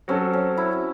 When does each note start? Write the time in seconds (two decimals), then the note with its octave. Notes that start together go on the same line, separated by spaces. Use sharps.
0.08 F#3 C4 C#4 F#4 A4
0.33 C#4
0.57 E4